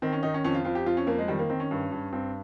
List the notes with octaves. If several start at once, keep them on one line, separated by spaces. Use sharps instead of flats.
D#3 C4
C#4
D#3 D#4
C#4
F2 C#4
F4
F2 F4
G4
F2 F4
C#4
F2 A#3
G#3
D#3 G3
A#3
D#3 C4
C#4
G2
G2
G2 C4